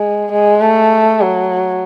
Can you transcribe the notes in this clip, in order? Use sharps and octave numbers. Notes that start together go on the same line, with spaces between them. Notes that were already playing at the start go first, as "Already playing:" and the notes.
Already playing: G#3
G#3
A3
F#3